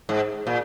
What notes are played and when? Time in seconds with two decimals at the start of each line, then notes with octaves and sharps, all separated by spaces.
0.09 G#2
0.47 A#2